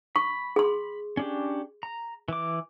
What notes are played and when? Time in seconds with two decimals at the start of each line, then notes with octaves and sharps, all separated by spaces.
0.16 B5 C#6
0.56 G#4 C6
1.17 C#4 D4 G4
1.83 A#5
2.28 E3 D6